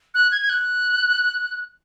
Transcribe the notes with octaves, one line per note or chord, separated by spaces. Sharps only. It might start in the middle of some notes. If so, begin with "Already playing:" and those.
F#6
G#6
G#6
F#6